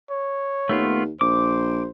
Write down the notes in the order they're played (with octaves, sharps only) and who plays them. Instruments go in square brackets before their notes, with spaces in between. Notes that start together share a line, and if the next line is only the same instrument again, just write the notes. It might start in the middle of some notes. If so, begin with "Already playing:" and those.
[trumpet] C#5
[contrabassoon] D#2 [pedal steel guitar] A3 B3 F4
[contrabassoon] A#1 [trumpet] C5 [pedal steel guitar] D6